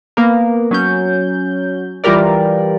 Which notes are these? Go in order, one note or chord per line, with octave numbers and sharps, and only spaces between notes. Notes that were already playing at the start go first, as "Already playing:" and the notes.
A#3 B3 A#4
F#3 C#4 G6
E3 G3 F4 G4 A#4 D5